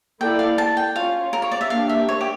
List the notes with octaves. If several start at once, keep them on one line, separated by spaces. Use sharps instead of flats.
A#3 E4 A4 D5 G5
F5
A5
G5
C#4 F4 C#5 F5
A#4
C#5
D5
E5
A#3 D4 G4 F5
E5
C#5
G4